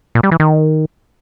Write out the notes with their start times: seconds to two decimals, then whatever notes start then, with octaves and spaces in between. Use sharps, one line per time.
0.15 A#2
0.23 G3
0.32 E3
0.40 D#3